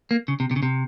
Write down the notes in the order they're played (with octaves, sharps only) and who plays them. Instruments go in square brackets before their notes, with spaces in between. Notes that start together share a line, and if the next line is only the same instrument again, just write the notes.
[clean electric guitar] A#3
C#3
C3
C3
C#3
C3